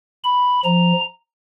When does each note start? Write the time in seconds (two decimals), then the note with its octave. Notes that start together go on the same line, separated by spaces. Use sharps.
0.24 B5
0.64 F3 A#5